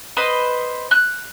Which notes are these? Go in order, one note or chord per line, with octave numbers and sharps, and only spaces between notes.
B4 C5 D#5
F#6